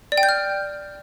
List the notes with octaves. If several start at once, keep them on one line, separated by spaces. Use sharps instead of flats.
D5
G5
G6
F6